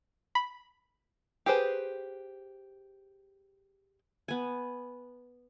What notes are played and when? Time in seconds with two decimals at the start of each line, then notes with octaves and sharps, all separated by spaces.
0.35 B5
1.46 G4 G#4 B4 C5
4.28 B3 G#5